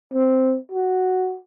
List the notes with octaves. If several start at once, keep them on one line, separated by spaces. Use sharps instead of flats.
C4
F#4